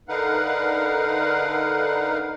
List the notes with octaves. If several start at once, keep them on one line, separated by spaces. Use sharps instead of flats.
D3 D#4 A#4 B4 F5 F#5